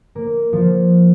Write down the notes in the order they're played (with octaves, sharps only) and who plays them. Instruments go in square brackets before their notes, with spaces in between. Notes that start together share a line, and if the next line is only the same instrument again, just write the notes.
[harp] A#3
F3